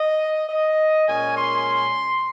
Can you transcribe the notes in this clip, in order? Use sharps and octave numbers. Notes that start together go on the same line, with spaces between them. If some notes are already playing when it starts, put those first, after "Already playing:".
Already playing: D#5
D#5
A#2 G#3 C#4 G#5
C6